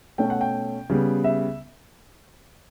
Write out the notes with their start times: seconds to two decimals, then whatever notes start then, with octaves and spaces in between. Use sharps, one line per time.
0.18 B2 A3 C#4 G5
0.30 F#5
0.41 G5
0.90 C#3 G3 B3
1.24 E5